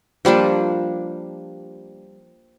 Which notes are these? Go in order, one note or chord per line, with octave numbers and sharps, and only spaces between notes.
F3 G3 A#3 D4